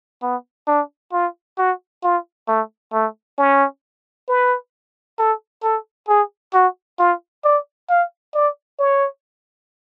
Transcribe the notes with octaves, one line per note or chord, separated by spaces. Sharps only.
B3
D4
F4
F#4
F4
A3
A3
C#4
B4
A4
A4
G#4
F#4
F4
D5
F5
D5
C#5